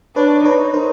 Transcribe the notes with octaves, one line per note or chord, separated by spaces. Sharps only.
D4 B4 C#5
D#4 B4 C#5
A#4 C5